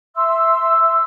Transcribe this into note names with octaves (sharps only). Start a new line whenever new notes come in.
E5 C6 E6